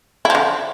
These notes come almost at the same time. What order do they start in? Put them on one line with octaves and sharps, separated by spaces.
E4 F3 D3